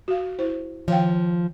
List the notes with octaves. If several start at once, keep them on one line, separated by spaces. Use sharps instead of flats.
F#4 F5
E4 C5
D#3 F3 F5 G5